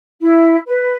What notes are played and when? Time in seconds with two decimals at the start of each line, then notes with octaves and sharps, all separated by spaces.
0.21 E4
0.67 B4